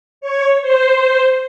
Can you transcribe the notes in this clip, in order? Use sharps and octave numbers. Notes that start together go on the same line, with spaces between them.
C#5
C5